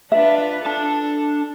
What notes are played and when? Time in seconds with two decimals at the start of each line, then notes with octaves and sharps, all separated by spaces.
0.12 D4 F4 B4 E5
0.66 D4 A4 A5